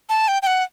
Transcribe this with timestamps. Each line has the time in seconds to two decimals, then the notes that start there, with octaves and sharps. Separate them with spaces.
0.09 A5
0.28 G5
0.42 G5
0.47 F#5